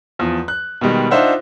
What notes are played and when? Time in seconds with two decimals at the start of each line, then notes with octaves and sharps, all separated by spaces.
0.19 E2 F3
0.48 F#6
0.81 B2 D#3 G3 G#3
1.11 D4 D#4 F4 C5 E5 F#5